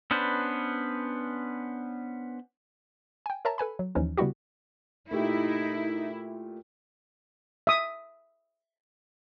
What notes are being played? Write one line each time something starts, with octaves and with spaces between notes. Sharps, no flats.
B3 C#4 D4 B4 C5
G5 G#5
A#4 C#5 E5 A5 A#5
A4 B4 G#5 B5
F#3
D#2 E3 F3 C#4 D#4
C#3 G3 B3 E4 F#4 G4
A#2 A3 D#4 E4 G4
E5 D#6